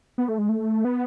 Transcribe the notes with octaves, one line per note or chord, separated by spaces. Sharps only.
B3
A3
G#3
A3
B3